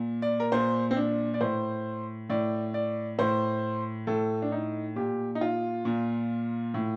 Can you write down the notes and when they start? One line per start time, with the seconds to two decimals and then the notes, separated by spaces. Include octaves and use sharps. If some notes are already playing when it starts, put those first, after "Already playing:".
Already playing: A#2
0.22 D5
0.40 A#4
0.52 A#2 C5
0.91 C4
0.96 D4
1.34 D5
1.41 A2 C5
2.30 A2 D5
2.74 D5
3.19 A2 C5
4.07 A2 A4
4.42 D4
4.52 D#4
4.96 A#2 G4
5.35 D#4
5.41 F4
5.85 A#2
6.74 A2